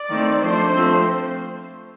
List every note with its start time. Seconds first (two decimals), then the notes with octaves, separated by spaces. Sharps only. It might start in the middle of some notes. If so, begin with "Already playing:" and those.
Already playing: D5
0.10 D#3 A3 C4
0.43 F3 A3 D4 C5
0.75 F3 A3 C4